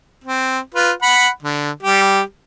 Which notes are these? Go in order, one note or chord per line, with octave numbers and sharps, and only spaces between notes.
C4
F4 B4
F#5 B5
D3
G3 G4